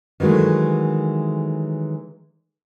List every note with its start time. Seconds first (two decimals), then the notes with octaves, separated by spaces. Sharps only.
0.20 D#3 E3 F#3 G#3 A3